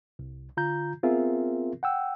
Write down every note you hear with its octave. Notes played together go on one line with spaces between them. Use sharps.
C2
D3 F4 A#5 G6
B3 C4 F4 G#4 A#4 E5
F#5 G5 E6